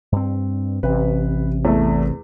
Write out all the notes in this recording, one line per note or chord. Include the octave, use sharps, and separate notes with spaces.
G2 C4
A1 C3 B4
E2 A3